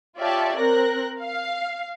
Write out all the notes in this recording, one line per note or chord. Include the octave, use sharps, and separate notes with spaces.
F4 G4 C#5 D5 E5 A5
C4 A#4 F#6 A#6
F5